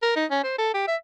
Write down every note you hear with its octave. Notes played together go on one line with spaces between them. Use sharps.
A#4
D#4
C#4
C5
A4
G4
E5